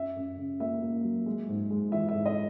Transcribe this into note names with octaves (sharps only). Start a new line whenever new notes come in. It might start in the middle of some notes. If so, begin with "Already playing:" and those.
Already playing: F#2 E5
F#2
C#3
A#3 E5
A#3
F#3
G#3
G#2
G#3
E3 E5
E5
G#2
D#5